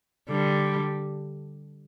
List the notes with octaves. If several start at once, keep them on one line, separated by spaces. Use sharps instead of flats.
D3 G3